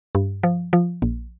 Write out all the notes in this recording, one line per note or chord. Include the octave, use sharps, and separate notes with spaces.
G2
F3
F3
A#1